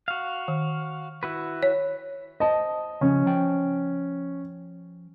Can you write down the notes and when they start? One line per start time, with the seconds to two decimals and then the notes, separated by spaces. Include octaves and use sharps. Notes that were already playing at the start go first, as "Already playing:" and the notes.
0.08 F#4 F5
0.48 D#3
1.23 E4 F#4 B4
1.63 C#5
2.40 C5 D#5 A5
3.01 C#3 F3 C#4
3.26 F3 G5